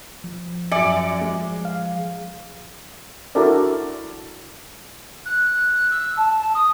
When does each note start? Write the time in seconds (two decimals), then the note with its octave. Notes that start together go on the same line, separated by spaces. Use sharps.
0.24 F3
0.72 F#2 D5 E5 G#5 C#7
1.21 G#3
1.65 F5
3.35 D4 E4 F#4 A4 A#4 D5
5.25 F#6
5.91 E6
6.17 A5
6.55 D#6